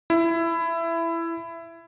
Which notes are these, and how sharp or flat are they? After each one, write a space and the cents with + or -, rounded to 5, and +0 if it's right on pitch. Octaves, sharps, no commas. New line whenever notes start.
E4 +15